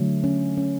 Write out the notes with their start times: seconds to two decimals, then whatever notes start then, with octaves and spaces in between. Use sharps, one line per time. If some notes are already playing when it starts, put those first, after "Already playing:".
Already playing: D3 F#3 A3
0.24 C#4
0.57 C#4